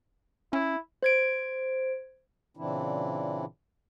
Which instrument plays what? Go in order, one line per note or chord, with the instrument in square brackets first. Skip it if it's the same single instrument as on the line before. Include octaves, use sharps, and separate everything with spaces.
[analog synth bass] C#4 [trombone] E4
[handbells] C5 G#6 D7
[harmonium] A#2 C#3 E3 C4 D4 E4